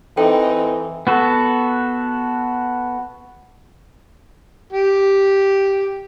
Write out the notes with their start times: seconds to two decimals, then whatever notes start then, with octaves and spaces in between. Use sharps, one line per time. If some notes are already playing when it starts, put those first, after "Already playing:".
0.17 E3 C4 D#4 A4 C5 G5
1.07 B3 F#4 A4
4.73 G4